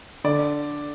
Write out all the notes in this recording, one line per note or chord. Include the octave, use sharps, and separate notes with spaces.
D3 D5